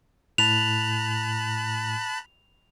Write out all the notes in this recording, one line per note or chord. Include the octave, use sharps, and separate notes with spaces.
A2 A5 B5 F#6 F7